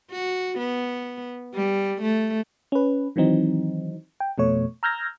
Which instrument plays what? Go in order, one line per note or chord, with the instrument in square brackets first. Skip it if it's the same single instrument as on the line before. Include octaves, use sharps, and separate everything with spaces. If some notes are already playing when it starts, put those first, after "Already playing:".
[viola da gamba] F#4
B3
G3
A3
[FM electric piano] C#4 B4
D#3 E3 F#3 C4 D#4
G5
F2 B2 A3 C#5
A#5 E6 F6 G6 G#6 A#6